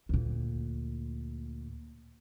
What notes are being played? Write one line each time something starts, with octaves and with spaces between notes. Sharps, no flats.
D2 A#2